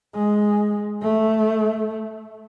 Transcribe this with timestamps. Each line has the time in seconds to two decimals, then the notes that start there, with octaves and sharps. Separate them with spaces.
0.15 G#3
1.02 A3